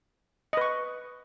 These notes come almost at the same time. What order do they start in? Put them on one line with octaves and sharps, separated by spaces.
D#5 B4 C#6